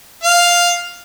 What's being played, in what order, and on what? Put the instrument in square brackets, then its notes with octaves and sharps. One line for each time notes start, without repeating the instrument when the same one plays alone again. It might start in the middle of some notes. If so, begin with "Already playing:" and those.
[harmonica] F5